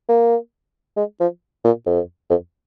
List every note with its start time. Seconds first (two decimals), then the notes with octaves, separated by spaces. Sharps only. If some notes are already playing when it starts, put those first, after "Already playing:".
0.09 A#3
0.97 G#3
1.20 F3
1.65 A#2
1.86 F2
2.30 F2